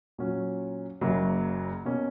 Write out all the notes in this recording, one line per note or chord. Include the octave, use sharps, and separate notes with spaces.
A#2 F#3 C#4 F#4
F#1 F#2 C#3 F#3 A#3
B2 A#3 C#4